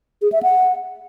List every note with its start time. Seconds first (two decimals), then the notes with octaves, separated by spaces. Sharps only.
0.22 G#4
0.32 E5
0.43 F#5